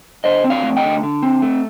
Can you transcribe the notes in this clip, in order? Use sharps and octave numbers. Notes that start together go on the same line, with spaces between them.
D3 C5 D#5
C4
D5 F5
A3
D#5 G5
D3
D3
C4
A3